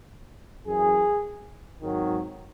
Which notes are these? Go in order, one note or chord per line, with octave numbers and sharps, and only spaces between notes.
F#2 E3 G#4
G#1 G#2 D#3 F#3